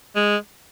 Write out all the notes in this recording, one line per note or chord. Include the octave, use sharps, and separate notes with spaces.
G#3